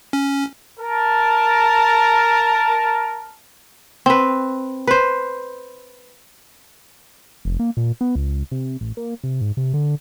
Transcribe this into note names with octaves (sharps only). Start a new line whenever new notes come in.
C#4
A#4 A5
C4 B4
B4 C5
F1
A#3
A#2
B3
C#2
C3
A1
A#3
C3
G#2
C3
D3